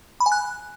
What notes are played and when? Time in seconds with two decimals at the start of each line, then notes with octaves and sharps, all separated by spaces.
0.20 B5
0.26 G#5
0.32 F#6